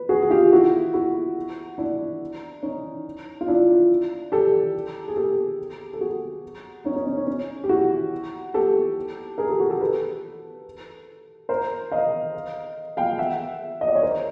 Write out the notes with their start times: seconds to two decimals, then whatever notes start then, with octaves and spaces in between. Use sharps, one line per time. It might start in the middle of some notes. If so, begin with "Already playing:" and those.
Already playing: B4
0.09 F#4 G#4
0.23 G#4
0.30 F4 G4
0.53 E4 F#4
0.94 E4 F#4
1.78 D4 E4
2.63 C#4 D#4
3.41 F4
3.48 D4 E4
4.32 G4 A4
5.08 G#4
5.16 G4 A4
5.93 A4
6.01 F#4 G#4
6.85 C#4 D#4
6.96 C#4
7.06 C#4
7.17 C#4
7.27 C#4
7.64 G4
7.69 E4 F#4
8.54 G4 A4
9.38 G#4 A#4
9.49 G4 A4
9.60 F#4 G#4
9.69 G4 A4
9.81 A4 B4
11.49 A#4 C5
11.92 D#5 F5
12.97 F5 G5
13.18 E5 F#5
13.81 D#5
13.88 D5
13.95 C#5
14.02 A#4 C5